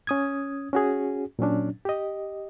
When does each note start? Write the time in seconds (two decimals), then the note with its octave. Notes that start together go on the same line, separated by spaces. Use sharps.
0.07 C#4 D#6 G#6
0.73 C#4 F#4 G#4
1.39 A#2 F#3 C#4 D4
1.85 G4 D#5